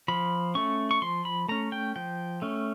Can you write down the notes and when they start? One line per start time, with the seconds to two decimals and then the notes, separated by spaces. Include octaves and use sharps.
0.08 F3 B5
0.55 A3 C#4 C#6
0.91 C#6
1.02 F3 C6
1.25 B5
1.48 A3 C#4 A#5
1.72 G5
1.96 F3 G5
2.42 A3 C#4